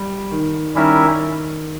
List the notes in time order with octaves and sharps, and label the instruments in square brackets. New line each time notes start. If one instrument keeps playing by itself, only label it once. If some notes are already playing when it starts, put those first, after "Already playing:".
Already playing: [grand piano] G3
D#3
[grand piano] D#3 [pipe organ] G3 C#4 E4 A#4 E5